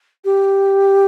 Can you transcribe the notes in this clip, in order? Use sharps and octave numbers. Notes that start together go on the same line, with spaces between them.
G4